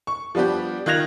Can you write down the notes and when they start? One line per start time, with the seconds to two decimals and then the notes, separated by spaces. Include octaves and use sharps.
0.07 C#6
0.35 F3 G3 B3 D4 G4
0.86 D#3 F4 F#6 G#6 A#6 F7